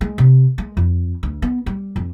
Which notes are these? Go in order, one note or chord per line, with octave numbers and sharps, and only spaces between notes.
G#3
C3
G#3
F2
D2
B3
G3
F2